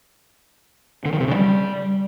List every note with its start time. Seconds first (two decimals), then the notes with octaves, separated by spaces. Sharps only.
1.05 D3
1.13 D#3
1.20 C3
1.28 C#3
1.35 G3